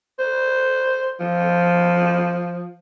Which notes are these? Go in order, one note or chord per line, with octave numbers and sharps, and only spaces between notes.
C5
F3